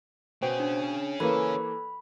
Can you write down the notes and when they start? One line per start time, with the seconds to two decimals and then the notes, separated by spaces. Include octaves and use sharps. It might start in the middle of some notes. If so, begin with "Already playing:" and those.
0.42 B2 C#4 G#4 C5 G5
0.60 D4
1.20 E3 A#3 A4 B4 C#5 B5